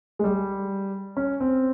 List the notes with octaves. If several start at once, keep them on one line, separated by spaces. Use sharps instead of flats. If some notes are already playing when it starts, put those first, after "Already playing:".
G#3
G3
C#4
C4